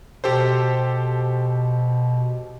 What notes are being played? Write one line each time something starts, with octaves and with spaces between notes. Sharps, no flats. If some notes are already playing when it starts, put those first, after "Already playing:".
B2 G4 A4 C5